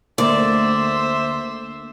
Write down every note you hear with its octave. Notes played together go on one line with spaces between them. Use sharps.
D2 A#3 C5 D5 E5